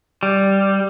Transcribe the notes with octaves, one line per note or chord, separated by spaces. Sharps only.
G3